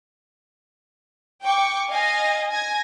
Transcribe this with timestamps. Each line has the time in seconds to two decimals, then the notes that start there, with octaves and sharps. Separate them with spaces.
1.44 G5 C#6 D6
1.89 D#5 F5 G#5
2.50 G#5 G#6 A#6